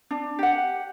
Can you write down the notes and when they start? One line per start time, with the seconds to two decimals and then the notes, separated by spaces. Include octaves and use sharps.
0.11 D4
0.39 G4 F#5